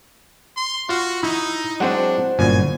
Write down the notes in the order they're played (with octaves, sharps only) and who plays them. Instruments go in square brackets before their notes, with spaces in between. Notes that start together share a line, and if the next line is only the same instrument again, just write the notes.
[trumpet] C6
[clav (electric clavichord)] F4 F5 [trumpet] F#4
[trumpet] D#4 [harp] E4
[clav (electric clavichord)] F#3 G#3 C4 [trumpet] D4 [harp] C5 F#5
[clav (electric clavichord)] G1 F#2 A#2 [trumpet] G#5